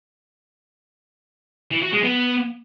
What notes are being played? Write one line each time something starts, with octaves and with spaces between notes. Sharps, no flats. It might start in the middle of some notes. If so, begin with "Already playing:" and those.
E3
F#4
G#3
B3